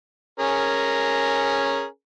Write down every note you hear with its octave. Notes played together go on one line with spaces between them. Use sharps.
C#4 G#4 A#4